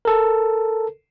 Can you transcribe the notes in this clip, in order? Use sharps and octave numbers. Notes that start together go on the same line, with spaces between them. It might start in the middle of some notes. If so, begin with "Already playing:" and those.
A4 A#4